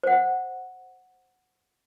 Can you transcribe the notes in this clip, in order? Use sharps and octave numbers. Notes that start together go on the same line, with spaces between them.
C5 F#5